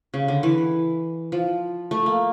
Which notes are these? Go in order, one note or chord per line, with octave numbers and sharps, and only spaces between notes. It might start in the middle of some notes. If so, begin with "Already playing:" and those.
C#3
D3
E3
F3
A3
A#3